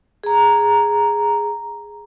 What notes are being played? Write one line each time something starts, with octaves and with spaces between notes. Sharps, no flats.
G#4 A#5